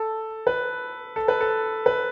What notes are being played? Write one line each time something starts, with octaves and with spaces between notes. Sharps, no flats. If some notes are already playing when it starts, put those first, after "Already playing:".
Already playing: A4
B4
A4
B4
A4
B4